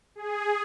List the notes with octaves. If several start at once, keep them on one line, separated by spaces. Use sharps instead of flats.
G#4